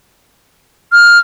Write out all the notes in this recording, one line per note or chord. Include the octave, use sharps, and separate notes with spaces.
F6